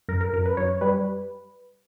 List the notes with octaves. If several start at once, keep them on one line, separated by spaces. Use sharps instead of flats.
F#2 A#4
A#4
F#2 A#4
B4
F#2 C#5
G3 B4